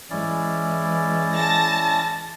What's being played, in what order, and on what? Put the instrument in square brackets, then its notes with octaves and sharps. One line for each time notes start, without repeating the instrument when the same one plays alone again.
[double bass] E3 G#3 [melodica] C#4 E4 D5
[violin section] A5 A6 A#6